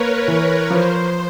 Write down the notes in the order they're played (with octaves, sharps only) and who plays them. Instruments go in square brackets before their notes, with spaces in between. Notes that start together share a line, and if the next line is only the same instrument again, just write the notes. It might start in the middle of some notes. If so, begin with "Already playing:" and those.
Already playing: [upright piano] A#3 [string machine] A#4 B4 C#5
[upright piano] E3
[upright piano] F3 [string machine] C5